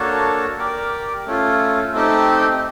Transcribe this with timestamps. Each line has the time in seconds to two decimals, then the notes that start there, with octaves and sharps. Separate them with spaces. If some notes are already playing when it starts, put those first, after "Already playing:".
Already playing: A#3 D4 F#4 A4 C#5
0.58 G4 A#4 D5
1.26 A3 C#4 F4
1.93 A3 C4 D#4 G4